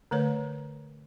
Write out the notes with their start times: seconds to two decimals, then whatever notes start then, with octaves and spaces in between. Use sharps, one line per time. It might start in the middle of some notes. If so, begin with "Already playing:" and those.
0.11 D3 A3 B4 C#5